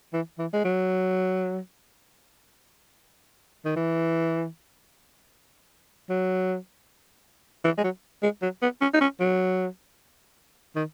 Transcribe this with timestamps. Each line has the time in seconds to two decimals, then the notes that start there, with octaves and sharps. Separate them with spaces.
0.13 E3
0.38 E3
0.53 G#3
0.65 F#3
3.65 D#3
3.76 E3
6.09 F#3
7.64 E3
7.78 G#3
7.84 F#3
8.23 G#3
8.42 F#3
8.62 B3
8.81 C#4
8.94 D#4
9.01 C#4
9.20 F#3
10.76 D#3